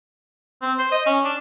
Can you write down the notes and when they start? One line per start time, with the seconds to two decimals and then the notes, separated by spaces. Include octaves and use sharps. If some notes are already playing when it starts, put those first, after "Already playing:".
0.62 C4
0.79 C5
0.92 D#5
1.06 C#4
1.25 D4